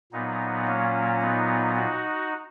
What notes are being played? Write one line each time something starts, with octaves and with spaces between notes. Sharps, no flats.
A#2 F#3 B3 D#4
A#3 C#4
B3 D#4
D#4 F#4